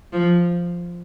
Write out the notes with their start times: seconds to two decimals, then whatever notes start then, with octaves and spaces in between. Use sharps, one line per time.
0.13 F3